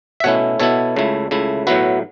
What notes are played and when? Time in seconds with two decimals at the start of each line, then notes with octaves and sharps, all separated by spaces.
0.20 E5
0.24 B2 A3 C#4 E4 C#5 F#5
0.60 B2 B3 E4 A4 C#5
0.96 C#2 C#3 A3 E4
1.31 C#2 C#3 A3 E4
1.67 A2 F#3 B3 E4 F#4 B4